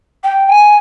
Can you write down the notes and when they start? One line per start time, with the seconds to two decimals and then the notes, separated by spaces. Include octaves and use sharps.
0.24 G5
0.49 G#5